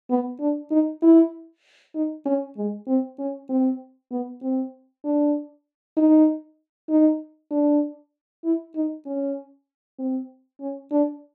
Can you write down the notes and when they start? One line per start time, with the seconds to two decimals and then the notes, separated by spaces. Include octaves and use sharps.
0.10 B3
0.40 D4
0.71 D#4
1.02 E4
1.95 D#4
2.26 C#4
2.57 G#3
2.88 C4
3.19 C#4
3.50 C4
4.12 B3
4.43 C4
5.05 D4
5.97 D#4
6.90 D#4
7.51 D4
8.45 E4
8.76 D#4
9.06 C#4
9.99 C4
10.61 C#4
10.92 D4